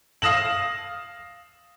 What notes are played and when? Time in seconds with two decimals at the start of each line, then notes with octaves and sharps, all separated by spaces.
0.22 F5 D#6 A#6 E7 F#7